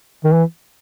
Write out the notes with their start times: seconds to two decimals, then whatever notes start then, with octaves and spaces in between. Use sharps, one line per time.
0.24 D#3
0.33 E3